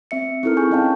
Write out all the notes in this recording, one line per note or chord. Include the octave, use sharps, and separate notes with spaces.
C4 E5 C#7
C4 D#4 E4 A4 A#4 F6
G#4 G#5 C#6 G6
B3 C#4 D#5 F5 G5 A5